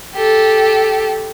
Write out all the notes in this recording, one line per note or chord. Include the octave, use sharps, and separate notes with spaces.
G4 A4